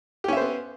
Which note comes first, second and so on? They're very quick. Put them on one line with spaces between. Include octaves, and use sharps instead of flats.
G4 C#4 E5 C5 B3